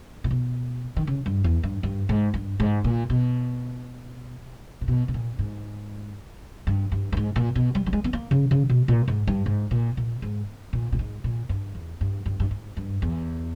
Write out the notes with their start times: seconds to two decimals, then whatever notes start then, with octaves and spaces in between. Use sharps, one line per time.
0.24 A#2
0.31 B2
0.96 D#3
1.07 C#3
1.26 G2
1.44 E2
1.63 G2
1.83 G2
2.09 G#2
2.34 G2
2.60 G#2
2.84 A#2
3.10 B2
4.81 A#2
4.88 B2
5.08 B2
5.14 A#2
5.39 G#2
6.67 G2
6.92 G2
7.12 G2
7.17 G#2
7.36 A#2
7.55 B2
7.75 G3
7.86 G3
7.93 G#3
8.04 B3
8.13 A#3
8.31 C#3
8.51 C#3
8.69 B2
8.88 A#2
9.08 G#2
9.27 G2
9.46 G#2
9.71 A#2
9.97 A#2
10.22 G#2
10.73 A#2
10.92 A#2
10.99 G#2
11.24 A#2
11.49 G2
11.75 E2
12.01 G2
12.26 G2
12.40 G2
12.51 G#2
12.77 G2
13.02 E2